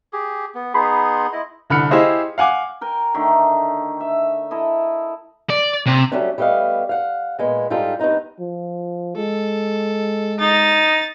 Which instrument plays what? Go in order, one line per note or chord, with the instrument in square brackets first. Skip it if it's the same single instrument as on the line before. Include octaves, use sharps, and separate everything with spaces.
[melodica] G4 G#4
B3
[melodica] B3 D#4 G#4 [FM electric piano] B5 C6
[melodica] E4 D#5
[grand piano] C2 D3 B5 F6 C#7
E4 G4 G#4 C5 D#5 F5
F5 F#5 G#5 D6
[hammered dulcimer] A#4 G5 G#5
D3 D#3 A3
E5
E4 A4 D#5
[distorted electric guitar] D5
C3
[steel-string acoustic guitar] F#3 G3 A3 C#4 D4
G3 A3 B3 D#5 F5
F5 F#5
A#2 G#3 B3
G#2 G3 D#4 F4 A4
G2 B3 C4 D#4 A#5
[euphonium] F3
[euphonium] G#3 [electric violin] A4
[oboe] D#4 [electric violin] A6